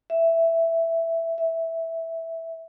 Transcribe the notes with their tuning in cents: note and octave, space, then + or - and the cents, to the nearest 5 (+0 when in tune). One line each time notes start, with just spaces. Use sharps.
E5 +5
E5 -5